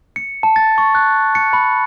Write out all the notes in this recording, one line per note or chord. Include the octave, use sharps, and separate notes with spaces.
C#7
A5
A6
C#6
F#6
C#7
B5